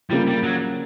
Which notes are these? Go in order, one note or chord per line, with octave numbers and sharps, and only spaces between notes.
C#3 F3 G3 A#3
G3
F#3